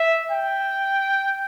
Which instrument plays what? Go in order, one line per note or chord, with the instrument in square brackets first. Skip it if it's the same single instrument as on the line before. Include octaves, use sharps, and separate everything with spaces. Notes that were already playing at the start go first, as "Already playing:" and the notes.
Already playing: [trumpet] E5
G5